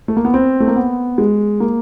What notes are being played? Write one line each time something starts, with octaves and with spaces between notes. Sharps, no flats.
A3
A#3
B3
C4
A3
A#3
B3
G#3
A#3